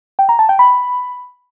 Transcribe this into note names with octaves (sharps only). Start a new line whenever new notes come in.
G5
A#5
A5
G5
B5